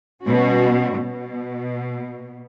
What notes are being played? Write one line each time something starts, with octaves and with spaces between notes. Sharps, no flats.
B2 G3 C#4 F#4
B2